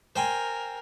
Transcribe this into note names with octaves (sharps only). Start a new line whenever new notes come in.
A#4 C5 G5 G#5